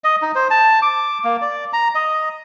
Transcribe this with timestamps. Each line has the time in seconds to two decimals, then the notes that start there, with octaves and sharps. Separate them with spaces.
0.04 D#5
0.22 D#4
0.35 C5
0.51 A5
0.82 D6
1.24 A#3
1.41 D5
1.73 A#5
1.95 D#5